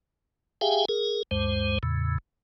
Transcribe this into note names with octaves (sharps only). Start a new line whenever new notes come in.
G4 G#4 E5 F5 G5 G#5
G#4 A#4
D2 G2 G#3 C5
E2 A2 C#3